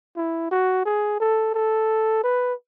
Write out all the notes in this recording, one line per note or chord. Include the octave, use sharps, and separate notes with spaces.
E4
F#4
G#4
A4
A4
B4